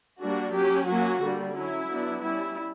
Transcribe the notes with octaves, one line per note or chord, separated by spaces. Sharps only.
G3 A#3 D4 F#4
F#3 C#4 G4
F#3 A#3 C#4 F#4
D3 G3 A#3
F#3 C#4 E4
F#3 B3 D4
G3 C#4 E4